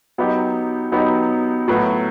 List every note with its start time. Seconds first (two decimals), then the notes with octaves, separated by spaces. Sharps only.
0.18 F#3 B3 D#4 G4
0.92 F#3 B3 D#4 G4
1.68 A2 F#3 B3 F#4 B4